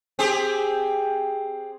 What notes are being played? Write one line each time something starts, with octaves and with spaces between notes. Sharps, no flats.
C4 G4 G#4